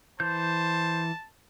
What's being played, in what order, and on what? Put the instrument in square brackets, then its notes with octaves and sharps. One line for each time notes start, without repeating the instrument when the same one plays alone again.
[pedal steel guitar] E3 G6 [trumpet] C5 [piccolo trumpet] A5